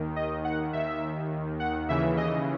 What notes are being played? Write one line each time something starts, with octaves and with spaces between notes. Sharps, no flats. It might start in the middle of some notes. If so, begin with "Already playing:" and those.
Already playing: D#2 D#3
D#5
F#5
D#2 D#3 E5
F#5
D#2 C#3 E3 E5
D#5